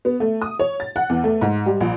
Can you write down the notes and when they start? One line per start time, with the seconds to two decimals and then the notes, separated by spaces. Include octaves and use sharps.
0.05 B3
0.20 A3
0.42 D#6
0.59 C#5
0.80 A6
0.96 F#5
1.10 E2
1.24 A3
1.41 G#2
1.66 G3
1.80 A#1